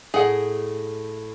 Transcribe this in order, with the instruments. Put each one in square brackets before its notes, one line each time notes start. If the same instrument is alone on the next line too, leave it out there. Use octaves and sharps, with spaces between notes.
[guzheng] A2 [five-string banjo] G#4 F#5